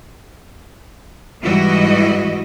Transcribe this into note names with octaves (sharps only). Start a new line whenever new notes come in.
G#2 E3 G3 E4 F#4 D#5